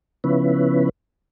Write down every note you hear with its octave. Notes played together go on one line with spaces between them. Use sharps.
C#3 F3 B3 C#4 E4 B4